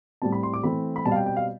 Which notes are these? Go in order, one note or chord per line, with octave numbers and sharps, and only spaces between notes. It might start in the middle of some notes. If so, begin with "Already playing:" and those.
A2 G3 C4 A5
B5
C6
D6
E3 A3 C4 B5
B5
B2 G3 C4 A5
F5
G5
G5
F5